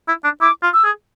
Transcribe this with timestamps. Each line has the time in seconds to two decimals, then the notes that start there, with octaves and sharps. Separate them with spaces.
0.08 E4
0.24 D4
0.41 E4 D6
0.63 F4
0.74 E6
0.84 G#4